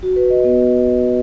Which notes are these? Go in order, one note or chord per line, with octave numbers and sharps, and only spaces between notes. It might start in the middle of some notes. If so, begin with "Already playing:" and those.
F#4
B4
D#5
B3